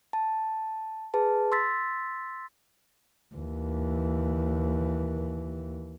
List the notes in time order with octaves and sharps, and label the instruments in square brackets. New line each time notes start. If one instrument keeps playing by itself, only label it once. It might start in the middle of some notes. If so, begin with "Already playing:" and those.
[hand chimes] A5
G#4 B4 A5
C6 E6 A6 B6
[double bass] D#2 E3